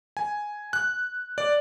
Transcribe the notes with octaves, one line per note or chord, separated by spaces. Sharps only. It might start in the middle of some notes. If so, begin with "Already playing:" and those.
G#5
F#6
D5